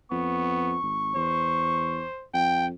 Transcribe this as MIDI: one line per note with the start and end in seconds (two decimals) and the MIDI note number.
0.11 0.77 41
0.11 0.79 59
0.11 2.09 85
0.83 1.14 32
1.15 2.05 40
1.15 2.26 72
2.34 2.72 41
2.34 2.67 79